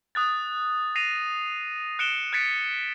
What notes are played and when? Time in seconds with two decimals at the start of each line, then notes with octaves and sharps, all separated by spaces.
0.15 D#6 F#6 A6
0.96 A#6 C7 D#7 F7
1.99 F#6 C#7 D7 E7 G7
2.33 F#6 G#6 A6 B6 C#7 D7